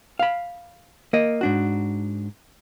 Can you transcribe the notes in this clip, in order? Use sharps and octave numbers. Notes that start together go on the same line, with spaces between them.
F5 B5
A#3 D#5
G#2 D4 F#4